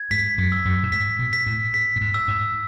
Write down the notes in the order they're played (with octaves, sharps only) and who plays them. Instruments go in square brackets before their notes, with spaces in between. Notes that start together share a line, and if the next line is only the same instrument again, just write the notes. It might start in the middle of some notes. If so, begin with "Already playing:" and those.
Already playing: [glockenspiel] G#6
[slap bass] G#2 [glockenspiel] B6
[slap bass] F#2
[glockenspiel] E6
[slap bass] F#2
A2
[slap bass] G#2 [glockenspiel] B6
[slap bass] B2
[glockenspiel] B6
[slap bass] A2
[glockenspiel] B6
[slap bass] A2
G#2
[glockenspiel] E6
[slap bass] G#2